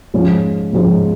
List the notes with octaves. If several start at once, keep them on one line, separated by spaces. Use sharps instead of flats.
G#2 F3 G#3 C#4 F4
G#2 F3 G#3 C#4 F4